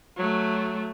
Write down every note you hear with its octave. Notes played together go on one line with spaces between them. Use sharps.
F#3 A3